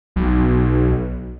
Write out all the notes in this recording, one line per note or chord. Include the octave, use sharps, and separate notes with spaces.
B1